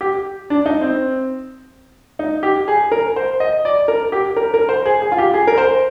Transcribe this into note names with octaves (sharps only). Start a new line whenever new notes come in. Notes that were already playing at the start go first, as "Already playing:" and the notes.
G4
D4
D#4
C4
D#4
G4
G#4
A#4
C5
D#5
D5
A#4
G4
A#4
A#4
C5
G#4
G#4
F4
G4
G#4
A#4
C5